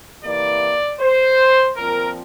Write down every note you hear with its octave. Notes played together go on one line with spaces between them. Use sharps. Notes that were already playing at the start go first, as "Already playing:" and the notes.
C3 E3 A#3 D5
C5
A#2 F3 C4 A#4